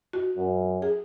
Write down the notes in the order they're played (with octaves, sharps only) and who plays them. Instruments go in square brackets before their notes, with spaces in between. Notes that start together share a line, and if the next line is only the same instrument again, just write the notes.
[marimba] F#4
[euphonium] F#2
[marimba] G#4